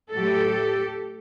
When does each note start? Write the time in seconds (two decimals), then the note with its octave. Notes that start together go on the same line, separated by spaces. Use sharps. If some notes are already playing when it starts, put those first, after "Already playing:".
0.14 A2 F#3 A3 G4 A4